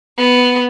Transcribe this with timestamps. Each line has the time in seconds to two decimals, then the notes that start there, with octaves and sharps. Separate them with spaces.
0.18 B3